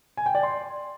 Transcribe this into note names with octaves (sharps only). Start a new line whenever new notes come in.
G#5
G5
D5
C6